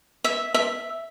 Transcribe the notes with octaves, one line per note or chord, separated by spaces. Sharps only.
E5
E5